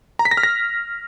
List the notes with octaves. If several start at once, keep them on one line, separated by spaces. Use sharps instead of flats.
A#5
B6
A#6
F6
A#6